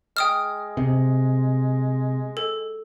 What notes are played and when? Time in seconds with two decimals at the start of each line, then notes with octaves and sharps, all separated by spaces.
0.17 G#3 G5 D#6 F6
0.77 C3
2.37 A4